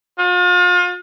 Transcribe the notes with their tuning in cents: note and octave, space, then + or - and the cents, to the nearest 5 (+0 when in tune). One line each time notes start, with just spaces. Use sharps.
F4 +40